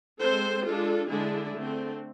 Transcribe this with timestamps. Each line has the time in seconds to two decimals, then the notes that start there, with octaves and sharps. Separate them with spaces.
0.20 G#3 C4 A4 C5
0.64 G#3 D4 F4 A4
1.09 D3 G#3 D4 E4 G#4
1.54 D3 A3 C4